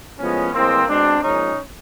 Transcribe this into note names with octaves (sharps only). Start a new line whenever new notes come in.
A2 F3 G#3 B3 C#4
A2 E3 G#3 A#3 C4
B2 G#3 C4 D4
A#2 F3 G#3 C#4 D#4